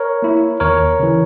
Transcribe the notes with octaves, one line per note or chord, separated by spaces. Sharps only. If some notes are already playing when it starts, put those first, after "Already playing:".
Already playing: A#4 C#5
A#3 E4
D#2 A#4 C#5
C#3 E3